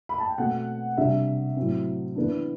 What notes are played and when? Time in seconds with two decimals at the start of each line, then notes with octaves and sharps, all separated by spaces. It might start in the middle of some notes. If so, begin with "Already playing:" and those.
0.09 B5
0.18 A5
0.28 G5
0.38 B2 A3 C4 F#5
0.97 C3 G3 D4 E5
1.57 A2 F#3 C4
2.16 E3 B3 D4